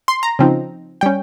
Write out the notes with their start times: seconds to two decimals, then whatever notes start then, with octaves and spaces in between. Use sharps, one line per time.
0.08 C6
0.23 A#5
0.39 C#3 F3 C4 D#4
1.01 G3 C#4 G5